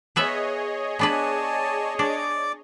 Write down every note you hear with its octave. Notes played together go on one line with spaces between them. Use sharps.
B3 G#4 B4 C#5 D#5 E5
B3 D4 B4 D5 G#5 A5
D4 D5 D6